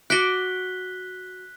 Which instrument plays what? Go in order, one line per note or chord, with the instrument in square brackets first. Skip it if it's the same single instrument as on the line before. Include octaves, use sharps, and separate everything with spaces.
[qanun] F#4 D6 [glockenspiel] F#6 B6 G7